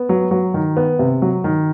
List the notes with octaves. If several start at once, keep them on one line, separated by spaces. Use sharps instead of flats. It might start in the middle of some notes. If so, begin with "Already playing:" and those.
Already playing: B3
F#3
F#3
D#3
B3
C3
F#3
D#3